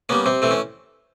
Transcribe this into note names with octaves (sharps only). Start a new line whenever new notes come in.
G3 A#3 B3 C#4
C3 C4
E3 A3 C4
C#4